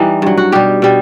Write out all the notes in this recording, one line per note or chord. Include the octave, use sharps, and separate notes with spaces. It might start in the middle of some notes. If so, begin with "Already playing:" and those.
Already playing: E3 G3 D#4
G2 F#3
F#4
B2 G3 G4
B2 G3